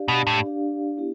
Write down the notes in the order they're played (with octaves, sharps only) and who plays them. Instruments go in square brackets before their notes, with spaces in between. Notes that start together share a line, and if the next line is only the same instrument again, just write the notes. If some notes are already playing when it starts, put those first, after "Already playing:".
Already playing: [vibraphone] D4 G4 D5 F5
[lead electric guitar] B2
A2
[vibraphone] D4 G4 D5 F5
B3 E4 G4